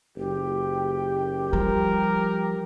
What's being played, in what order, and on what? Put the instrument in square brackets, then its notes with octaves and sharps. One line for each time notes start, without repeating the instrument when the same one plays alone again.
[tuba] F#1 [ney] G4
[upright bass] F3 [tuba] G3 [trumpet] A#4